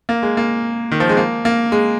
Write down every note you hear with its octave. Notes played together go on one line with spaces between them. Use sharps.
A#3
G#3
A#3
D#3
F3
G#3
A#3
A#3
G#3